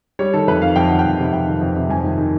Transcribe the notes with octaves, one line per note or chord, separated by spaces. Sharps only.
G3 C#5
D#3 A4
F2 B4
F2 F5
F2 G5
D#3 F#5
G5
F2
C3
F2 G5
D#3
F2
C3
F2 G#5
D#3
D#3